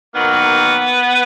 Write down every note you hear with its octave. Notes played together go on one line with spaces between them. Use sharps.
D#3 F#3 A#3 B3